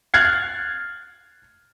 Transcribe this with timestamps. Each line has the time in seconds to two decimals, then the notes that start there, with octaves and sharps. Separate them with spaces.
0.14 F6 F#6 G#6 A6 C7